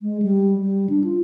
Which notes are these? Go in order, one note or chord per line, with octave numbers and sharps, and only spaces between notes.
G#3
G3
G3
D4
F4